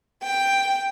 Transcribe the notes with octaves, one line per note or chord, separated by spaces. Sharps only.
G5